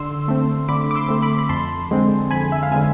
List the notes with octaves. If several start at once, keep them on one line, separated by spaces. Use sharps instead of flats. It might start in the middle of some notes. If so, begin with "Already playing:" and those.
Already playing: D3 C6 E6
A3 C4
D3 B5 D6
D6
C6 E6
A3 C4
B5 D6
B5
F2 A5 C6
D3 G#3 C4
F2 G#5 B5
E5
F5
D3 G#3 C4 E5 G#5